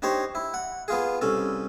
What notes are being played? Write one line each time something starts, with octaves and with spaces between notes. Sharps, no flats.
D4 D#4 G4 C5 C#5
E4
F#5
B3 F4 G#4
C2 C#4 A4